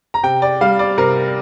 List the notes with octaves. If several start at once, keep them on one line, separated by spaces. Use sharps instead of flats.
A#5
C3 G5
D5
G3 F5
D5
C3 A#4